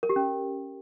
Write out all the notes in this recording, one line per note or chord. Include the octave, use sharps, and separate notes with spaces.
A#4
G4
C#4